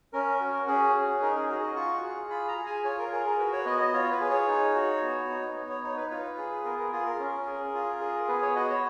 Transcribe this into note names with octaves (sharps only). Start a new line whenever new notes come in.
C#4 A#4
F#4
C#4 G#4
G#4
D#4 A#4
G#4
F#4 G#4
D#5
F4 C#6
G#4
F4 B5
A#5
G#4
G#5
F4 C#5
A#4
G#4 A#4
A#4
F#4 B4
C#5
B3 D#5
D#5
F4 C#5
B4
G#4
C#5
D#4
F#4
B3
D#4
B3
C#5
D#4 C#5
B4
F4 B4
G#4
B3 A#4
A#4
F4 G#4
A#4
C#4
G#4
F4
G#4
B3 B4
C#5
F#4 D#5
C#5